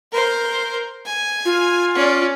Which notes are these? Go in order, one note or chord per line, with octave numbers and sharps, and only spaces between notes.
A#4 C5
G#5
F4
C#4 D5